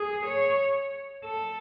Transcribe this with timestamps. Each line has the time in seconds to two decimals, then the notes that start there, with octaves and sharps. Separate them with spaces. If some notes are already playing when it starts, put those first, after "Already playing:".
Already playing: G#4
0.25 C#5
1.25 A4